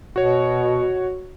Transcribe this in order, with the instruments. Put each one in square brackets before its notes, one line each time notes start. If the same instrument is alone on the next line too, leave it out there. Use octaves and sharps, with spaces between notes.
[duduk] B2 [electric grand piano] F#4 C#5